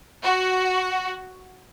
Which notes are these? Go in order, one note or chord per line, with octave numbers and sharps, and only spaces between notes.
F#4